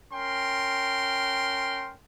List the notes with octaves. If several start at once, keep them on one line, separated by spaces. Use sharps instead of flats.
C#4 A#4 G5 C6